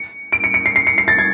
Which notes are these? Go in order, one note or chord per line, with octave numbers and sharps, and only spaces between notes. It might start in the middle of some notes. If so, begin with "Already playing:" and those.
Already playing: C#7
D7
C#7
C#7
C7
C7
C#7
C7
A6
G#6